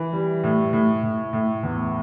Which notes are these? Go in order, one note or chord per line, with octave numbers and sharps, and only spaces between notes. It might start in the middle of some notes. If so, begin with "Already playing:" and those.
Already playing: E3
G3
A2
A2
A2
A2
E2